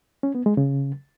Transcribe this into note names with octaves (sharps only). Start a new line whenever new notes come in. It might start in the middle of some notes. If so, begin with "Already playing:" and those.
C#4
B3
G#3
C#3